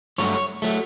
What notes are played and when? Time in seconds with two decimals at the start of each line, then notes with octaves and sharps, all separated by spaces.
0.18 G2 F#3 A3 C#5
0.62 F#3 A3